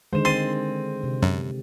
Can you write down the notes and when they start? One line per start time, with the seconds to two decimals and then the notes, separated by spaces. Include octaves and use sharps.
0.13 D3 D#3 G#3 C5 E7
0.25 C4 C6 A6 D#7
1.04 C3
1.22 F#2